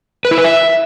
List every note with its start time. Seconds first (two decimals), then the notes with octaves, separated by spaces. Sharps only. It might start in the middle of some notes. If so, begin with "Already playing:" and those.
0.25 B4
0.31 E4
0.38 B4
0.44 E5